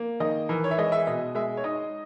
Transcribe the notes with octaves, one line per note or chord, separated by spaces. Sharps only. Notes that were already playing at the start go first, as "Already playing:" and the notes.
Already playing: A#3
D#3 D#5
E3 A#4
C#5
E5
G#3 D#5
E5
B2 D#5
G#3 E5
C#5
D#4 D#5